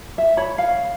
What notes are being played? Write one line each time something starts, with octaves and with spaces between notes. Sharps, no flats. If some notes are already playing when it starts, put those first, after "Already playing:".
E5
C#5 B5
F5